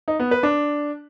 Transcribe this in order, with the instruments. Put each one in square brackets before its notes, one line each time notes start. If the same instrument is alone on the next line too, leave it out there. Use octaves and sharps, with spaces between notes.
[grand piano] D#4
B3
B4
D4